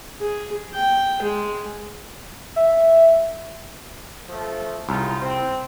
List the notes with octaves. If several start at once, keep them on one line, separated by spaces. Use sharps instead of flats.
G#4
G5
G#3
E5
F3 A3 A4
C2 C#3 D#4 F4
C4